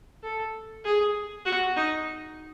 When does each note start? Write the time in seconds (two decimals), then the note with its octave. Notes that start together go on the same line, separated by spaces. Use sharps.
0.23 A4
0.84 G#4
1.45 F#4
1.76 D#4